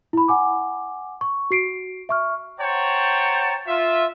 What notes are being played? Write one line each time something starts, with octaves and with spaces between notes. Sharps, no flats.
E4 B5
F#5 G#5 D6
C#6
F#4 C7 D7
E5 C#6 F6
C5 C#5 F#5 G5 A5 A#5
F4 E5